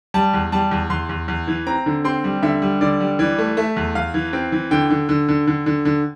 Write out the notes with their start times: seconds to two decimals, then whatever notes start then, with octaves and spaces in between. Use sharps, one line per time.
0.14 G3 A5
0.33 E2
0.52 G3 A5
0.71 E2
0.90 E2 C6
1.09 E2
1.28 E2
1.47 E3
1.67 C4 A#5
1.86 D3
2.04 C4 C6
2.24 G3
2.42 D3 E5
2.62 G3
2.81 D3 D5
3.00 G3
3.19 E3 D5
3.38 A3
3.57 A3 E5
3.76 E2
3.95 E2 F5
4.14 E3
4.33 C4
4.52 E3
4.71 D3 G5
4.90 D3
5.09 D3
5.29 D3
5.47 D3
5.66 D3
5.85 D3